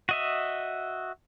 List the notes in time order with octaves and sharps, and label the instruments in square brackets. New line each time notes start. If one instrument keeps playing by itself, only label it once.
[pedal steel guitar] F#4 D#5 E5